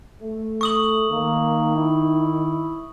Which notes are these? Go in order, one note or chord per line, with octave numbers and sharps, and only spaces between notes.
A3
C#6 D#6 F#7
D#3 A#3
E4